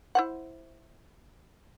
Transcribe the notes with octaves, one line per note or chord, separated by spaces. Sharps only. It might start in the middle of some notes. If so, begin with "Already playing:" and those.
E4 C5 F#5